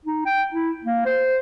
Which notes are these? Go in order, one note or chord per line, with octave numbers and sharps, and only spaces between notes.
D#4
G5
E4
A#3
C5